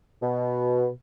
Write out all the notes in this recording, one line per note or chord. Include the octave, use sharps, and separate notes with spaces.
B2